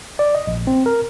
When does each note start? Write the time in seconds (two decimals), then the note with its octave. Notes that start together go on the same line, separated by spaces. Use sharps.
0.19 D5
0.35 D#5
0.47 A#1
0.67 C4
0.86 A#4